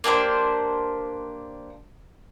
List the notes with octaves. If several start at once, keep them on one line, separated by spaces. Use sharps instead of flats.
A#3 D4 G4 C5